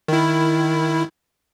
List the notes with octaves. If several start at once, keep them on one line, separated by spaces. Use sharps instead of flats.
D#3 E4